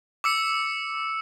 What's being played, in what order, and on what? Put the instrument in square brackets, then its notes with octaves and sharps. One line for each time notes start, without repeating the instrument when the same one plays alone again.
[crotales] D6 E6 C#7